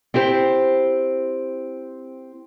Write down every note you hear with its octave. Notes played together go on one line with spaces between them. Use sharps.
C4 E4 G4 C5